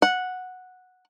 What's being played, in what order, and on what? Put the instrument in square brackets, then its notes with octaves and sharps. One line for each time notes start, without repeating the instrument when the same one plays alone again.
[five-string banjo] F#5